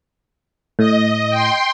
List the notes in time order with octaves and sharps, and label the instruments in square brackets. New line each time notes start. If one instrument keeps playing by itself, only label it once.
[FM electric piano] A2 [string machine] D#5
[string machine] G5 C6